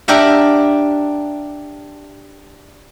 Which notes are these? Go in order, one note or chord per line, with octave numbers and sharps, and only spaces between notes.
D4 G4 A#4 E5 F#5